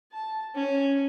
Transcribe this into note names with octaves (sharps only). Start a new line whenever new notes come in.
A5
C#4